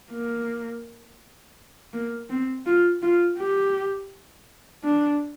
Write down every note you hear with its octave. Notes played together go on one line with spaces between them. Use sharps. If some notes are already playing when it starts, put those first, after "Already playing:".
A#3
A#3
C4
F4
F4
G4
D4